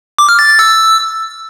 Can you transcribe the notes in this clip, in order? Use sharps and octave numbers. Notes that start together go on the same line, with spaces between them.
D6
F6
A6
A6
E6